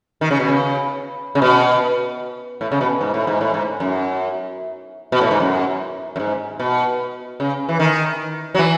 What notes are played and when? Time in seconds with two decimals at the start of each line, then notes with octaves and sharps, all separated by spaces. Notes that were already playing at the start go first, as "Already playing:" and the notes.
0.21 D#3
0.31 C#3
0.40 B2
0.49 C#3
1.35 C#3
1.42 B2
2.61 A2
2.72 C#3
2.81 B2
3.01 G#2
3.14 A2
3.27 G#2
3.41 A2
3.54 G#2
3.80 F#2
5.12 B2
5.21 A2
5.31 G#2
5.40 F#2
6.16 F#2
6.20 G#2
6.59 B2
7.40 C#3
7.69 E3
7.79 D#3
8.55 F#3
8.59 E3